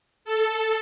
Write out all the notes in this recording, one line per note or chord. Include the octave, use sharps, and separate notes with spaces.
A4